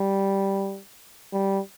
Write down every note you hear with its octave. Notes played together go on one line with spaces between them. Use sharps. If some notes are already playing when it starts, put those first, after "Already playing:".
Already playing: G3
G3